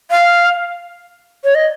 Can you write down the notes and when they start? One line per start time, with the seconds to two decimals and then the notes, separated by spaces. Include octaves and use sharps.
0.11 F5
1.44 C#5
1.55 D#5